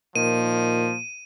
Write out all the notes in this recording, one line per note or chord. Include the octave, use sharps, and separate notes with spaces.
A#2 D#3 F3 D#7